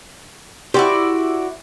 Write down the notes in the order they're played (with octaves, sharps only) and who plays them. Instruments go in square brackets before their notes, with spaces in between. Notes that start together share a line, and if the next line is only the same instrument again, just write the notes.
[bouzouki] E4 F#4 D5 [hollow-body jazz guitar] G4 C5